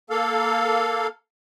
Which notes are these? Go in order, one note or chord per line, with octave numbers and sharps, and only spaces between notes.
A#3 A4 F5